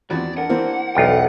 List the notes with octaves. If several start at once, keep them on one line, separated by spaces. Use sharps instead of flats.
E2 C4 F4 F#4 D5
D4 A#4 F#5
E3 A#3 C4
B1 E2 F4 A4 G5